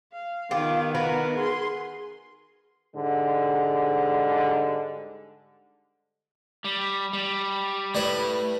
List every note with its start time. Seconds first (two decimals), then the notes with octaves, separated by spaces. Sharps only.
0.12 F5
0.51 D#3 B3 F4 G4
0.95 F#4 A#4 B4
1.36 G#4 C6
2.95 G#2 D3 G3 G#3
6.64 G3
7.13 G3
7.95 A2 G3 B4